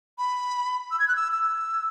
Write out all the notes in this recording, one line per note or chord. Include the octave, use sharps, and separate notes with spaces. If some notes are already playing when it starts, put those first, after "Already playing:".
B5
E6
G#6
F#6
E6
E6